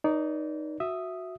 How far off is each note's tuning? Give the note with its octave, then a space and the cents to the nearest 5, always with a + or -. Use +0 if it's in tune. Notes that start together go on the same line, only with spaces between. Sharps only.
D#4 -5 B4 -35 D5 -35
F#4 -10 E5 +0 D#6 +0